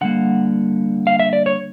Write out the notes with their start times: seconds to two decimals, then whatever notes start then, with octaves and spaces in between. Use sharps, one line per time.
0.01 D3 G3 A#3 F#5
1.07 F5
1.20 E5
1.33 D5
1.46 C#5